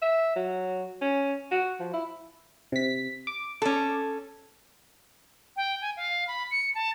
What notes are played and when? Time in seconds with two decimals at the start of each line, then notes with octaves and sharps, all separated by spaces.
0.02 E5
0.36 F#3
1.02 C#4
1.51 F#4
1.80 F3
1.93 E4
2.72 C3 B6
3.27 D6
3.62 C#4 A4
5.56 G5
5.81 G#5
5.97 F5
6.27 B5
6.51 C#7
6.74 A5